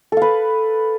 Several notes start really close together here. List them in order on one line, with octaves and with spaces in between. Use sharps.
A4 F5 B4